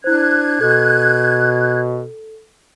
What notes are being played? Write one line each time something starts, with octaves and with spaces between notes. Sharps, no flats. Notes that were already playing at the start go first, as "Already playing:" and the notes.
D4 E4 C5 F#6 G#6
B2 A4